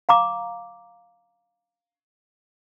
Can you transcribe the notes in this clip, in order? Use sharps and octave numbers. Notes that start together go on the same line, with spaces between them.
F5 A#5 D6